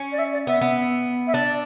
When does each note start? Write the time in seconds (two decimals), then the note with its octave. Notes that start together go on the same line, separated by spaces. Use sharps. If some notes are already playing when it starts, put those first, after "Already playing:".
Already playing: C#4
0.12 D5
0.18 E5
0.33 D5
0.47 B3 E5
0.61 B3
1.27 E5
1.34 D4 D5